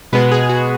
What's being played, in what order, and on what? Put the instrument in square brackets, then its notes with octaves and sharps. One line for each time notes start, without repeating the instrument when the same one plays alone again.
[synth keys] B2 G#3 B3 B4
G#4
F#4